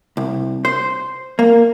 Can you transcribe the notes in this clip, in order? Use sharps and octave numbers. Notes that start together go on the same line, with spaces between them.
C2
C5
A#3